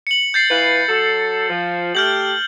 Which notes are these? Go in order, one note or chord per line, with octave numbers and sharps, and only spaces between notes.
C#7 F#7
G6 A6 C7
E3 F4 B4
F#3 A4
F3
A3 G4 F6 G6 F#7